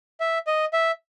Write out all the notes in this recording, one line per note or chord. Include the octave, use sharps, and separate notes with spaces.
E5
D#5
E5